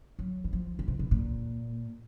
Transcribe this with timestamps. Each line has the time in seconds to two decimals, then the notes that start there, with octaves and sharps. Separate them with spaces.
0.19 F#3
0.44 E3
0.53 F3
0.79 C#3
0.88 C3
0.99 B2
1.11 A#2